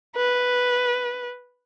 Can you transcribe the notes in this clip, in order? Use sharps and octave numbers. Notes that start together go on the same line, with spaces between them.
B4